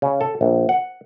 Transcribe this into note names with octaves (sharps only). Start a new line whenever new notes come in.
C#3
A4
A#1
F#5